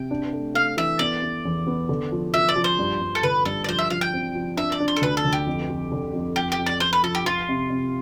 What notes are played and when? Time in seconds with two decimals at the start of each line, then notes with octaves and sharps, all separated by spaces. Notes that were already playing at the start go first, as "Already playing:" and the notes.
Already playing: C3 G5
0.11 D4
0.33 A3
0.54 A3 F5
0.77 E3 E5
0.99 B3 D5
1.22 B3
1.45 E2
1.67 B3
1.89 D3
2.12 F3
2.34 F3 E5
2.49 D5
2.56 F3
2.64 C5
2.79 G2
3.01 G2
3.15 A4
3.23 D3 B4
3.45 G2 A4
3.64 D5
3.68 F3 C5
3.79 E5
3.90 F3 F5
4.01 G5
4.13 C4
4.35 F3
4.57 D4 E5
4.72 D5
4.80 D4
4.88 C5
4.96 A4
5.02 D2 B4
5.17 A4
5.25 D2
5.33 G4
5.47 F2
5.70 F2
5.92 D3
6.13 F2
6.36 F2 G4
6.52 G4
6.59 F2
6.66 D5
6.80 F2 C5
6.93 B4
7.03 F3 A4
7.15 G4
7.25 F3 F4
7.49 C3
7.70 C3